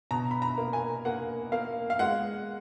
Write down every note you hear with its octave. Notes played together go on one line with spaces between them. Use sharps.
B2 A#5
B5
A#5
A#3
G#5
A#3 F#5
A#3 F5
F5
G#3 F#5